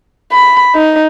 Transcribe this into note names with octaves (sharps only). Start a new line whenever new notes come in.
B5
D#4